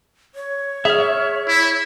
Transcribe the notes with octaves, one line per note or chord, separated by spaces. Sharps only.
C#5
G#4 E5 F6
E4